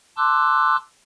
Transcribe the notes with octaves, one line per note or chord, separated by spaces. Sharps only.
A5 C6 D6 E6 F#6